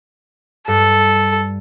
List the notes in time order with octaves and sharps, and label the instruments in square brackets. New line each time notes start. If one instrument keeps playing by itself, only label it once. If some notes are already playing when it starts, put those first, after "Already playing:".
[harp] G2 [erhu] A4